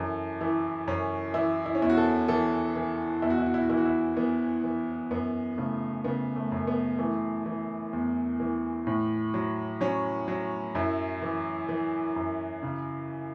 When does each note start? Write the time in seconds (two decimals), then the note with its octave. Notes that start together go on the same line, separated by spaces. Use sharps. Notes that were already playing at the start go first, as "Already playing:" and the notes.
Already playing: F#2 E3 A4
0.41 E3 E4
0.87 F#2 C#4
1.34 E3 E4
1.66 E4
1.75 C#4
1.82 E2 E4
1.90 F#4
1.97 A4
2.28 E3 A4
2.76 E3
3.22 E2 E4
3.30 F#4
3.38 E4
3.46 F#4
3.54 E4
3.62 F#4
3.70 E3 E4
3.77 F#4
3.85 E4
4.17 E3 B3
4.64 E3
5.11 F#2 B3
5.58 C#3 A3
6.04 C#3 B3
6.36 A3
6.52 F#2
6.67 B3
6.99 E3 A3
7.46 E3
7.93 E2
8.40 E3
8.87 A2
9.34 F#3
9.81 F#3 C#4
10.28 F#3
10.75 F#2 E4
11.22 E3
11.69 E3
12.16 F#2
12.63 C#3